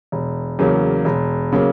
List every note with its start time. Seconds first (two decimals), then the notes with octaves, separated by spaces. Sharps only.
0.12 E1
0.59 E2 C#3 F#3 A#3
1.05 E1
1.52 C#3 F#3 A#3